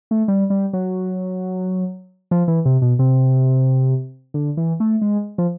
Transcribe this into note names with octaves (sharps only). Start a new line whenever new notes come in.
A3
G3
G3
F#3
F3
E3
C3
B2
C3
D3
E3
A3
G#3
F3